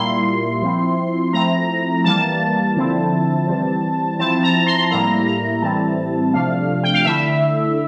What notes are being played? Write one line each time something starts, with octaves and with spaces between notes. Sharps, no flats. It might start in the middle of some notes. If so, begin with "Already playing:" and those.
Already playing: A#2 G3 A#3 E4 C6
F3 C4 E4
F3 A3 C4 E4 A#5
E3 G3 A#3 A5
D3 F3 C4 E4
E3 G3 C4
F3 C4 E4 A5
A#5
C6
A2 G3 A#3 E4 A#5
A#5
A2 E3 G3 C4 E4 A5
C3 F3 A3 D4 F5
G5
F5
D3 A3 E4 E5